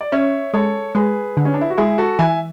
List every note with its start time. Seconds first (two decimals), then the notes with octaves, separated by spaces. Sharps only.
0.01 D5
0.12 C#4 C#5 E5
0.54 G#3 A4 C#5
0.95 G#3 G#4 B4
1.37 D3
1.45 C#4
1.54 D4
1.61 E4
1.70 F#4
1.77 G#3 E4 G#4
1.98 F#4 A4
2.19 E3 E5 G#5